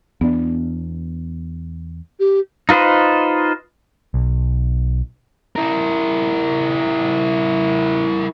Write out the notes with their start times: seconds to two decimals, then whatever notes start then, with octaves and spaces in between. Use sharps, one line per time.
0.21 E2 B3 D4
2.20 G4
2.69 D#4 F4 B4 C5 D#5
4.14 B1
5.56 E4 A#4